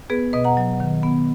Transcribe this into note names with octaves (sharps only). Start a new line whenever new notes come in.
B3 G#4 B4
B2 B4 D#5
F#5 A#5
F#3
D#3
B3